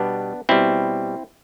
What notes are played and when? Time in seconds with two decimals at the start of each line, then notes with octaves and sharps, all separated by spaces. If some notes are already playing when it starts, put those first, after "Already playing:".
Already playing: B2 G3 B3 D4
0.49 B2 G3 C4 E4